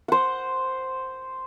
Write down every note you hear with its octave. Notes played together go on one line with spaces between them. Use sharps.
C5 F#5